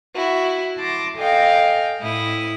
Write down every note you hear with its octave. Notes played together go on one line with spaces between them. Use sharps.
E4 F#4
A5 C6 D6 A#6
A4 D#5 F5 G5 G#5
A2 E4 D#6